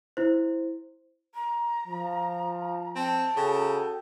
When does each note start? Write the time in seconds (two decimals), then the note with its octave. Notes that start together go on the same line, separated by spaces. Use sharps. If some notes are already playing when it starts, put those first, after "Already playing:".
0.17 E4 C5
1.34 A#5
1.87 F3
2.96 C4 A5
3.37 C#3 F#4 A4 G5